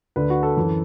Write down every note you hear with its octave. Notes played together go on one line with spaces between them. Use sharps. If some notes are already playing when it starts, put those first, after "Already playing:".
D2 D3 B4
F#4
A4
F#2 E3